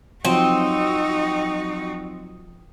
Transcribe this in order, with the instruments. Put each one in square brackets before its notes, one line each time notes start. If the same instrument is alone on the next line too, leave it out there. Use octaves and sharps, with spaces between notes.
[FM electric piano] F3 F#3 D#6 [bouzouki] C4 [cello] D#4 F#4